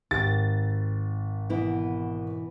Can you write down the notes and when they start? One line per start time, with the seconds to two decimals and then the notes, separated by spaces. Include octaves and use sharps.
0.11 G#1 G4 A6
1.50 B2 E3 E4